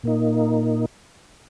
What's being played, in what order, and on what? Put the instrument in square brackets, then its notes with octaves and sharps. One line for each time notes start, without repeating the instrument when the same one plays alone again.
[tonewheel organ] A#2 A#3 D#4